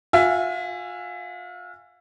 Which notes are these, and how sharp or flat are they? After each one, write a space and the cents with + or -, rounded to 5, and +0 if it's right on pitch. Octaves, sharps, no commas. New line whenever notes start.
F4 +40 E5 +25 G#5 -15